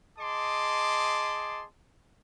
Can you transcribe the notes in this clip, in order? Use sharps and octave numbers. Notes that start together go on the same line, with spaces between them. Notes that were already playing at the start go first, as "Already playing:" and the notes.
G#4 D#5 A5 C6 D6